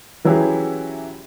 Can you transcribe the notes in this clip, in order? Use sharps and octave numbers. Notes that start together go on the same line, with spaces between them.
E3 F#3 C#4 E4 G4 G#4